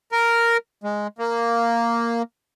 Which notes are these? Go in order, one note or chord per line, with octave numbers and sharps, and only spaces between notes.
A#4
G#3
A#3